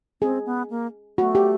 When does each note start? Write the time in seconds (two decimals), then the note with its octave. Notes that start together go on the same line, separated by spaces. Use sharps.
0.22 C4 G#4
0.46 B3
0.70 A#3
1.18 A3 F#4
1.35 G4